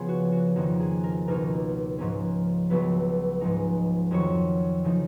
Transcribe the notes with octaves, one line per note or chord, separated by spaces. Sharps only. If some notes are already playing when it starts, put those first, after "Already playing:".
Already playing: C#3 F3 B3 G#4
F#4
F#4
F2 D#3 A#3 D#4 F#4
G#4
A#4
C#2 B2 A#3 D#4 A#4
G#2 F3 A#3 C#4
C#2 C#3 F#3 B3 B4
G#2 F3 G#3 D#4
F2 D#3 F#3 C#5
C#3 F3 A#3 D#4